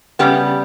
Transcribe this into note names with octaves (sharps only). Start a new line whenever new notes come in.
C#3 E3 G3 B3 G4